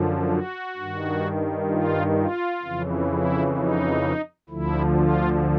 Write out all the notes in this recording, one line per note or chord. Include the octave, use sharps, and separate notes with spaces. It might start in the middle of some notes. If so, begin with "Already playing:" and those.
Already playing: F#2 D3 F3
F#4
G2 D#3
F4
F4
F2 C#3 E3
E4
D#4
D2 D3 F3 E4
F4